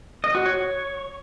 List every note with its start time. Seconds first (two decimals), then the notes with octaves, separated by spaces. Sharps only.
0.24 D#5
0.35 F#4
0.46 C#5